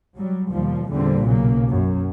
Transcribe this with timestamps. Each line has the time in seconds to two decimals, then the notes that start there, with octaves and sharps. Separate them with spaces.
0.18 F#3 G3
0.50 D#2 B2 F3 G3
0.90 E2 A#2 D3 G3 C4
1.23 B1 C#3 F#3 A#3
1.70 F#2